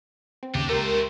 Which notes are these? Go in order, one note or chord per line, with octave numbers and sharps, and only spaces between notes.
C4
D#2 C#3 D4 G4
C#2 A3 G4 A#4 C5